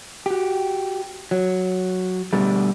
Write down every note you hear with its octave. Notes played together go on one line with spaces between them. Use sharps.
F#4 G4
F#3
B2 D3 G3 A3